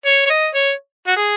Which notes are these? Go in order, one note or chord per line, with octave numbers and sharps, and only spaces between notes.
C#5
C#5
D#5
C#5
F#4
G#4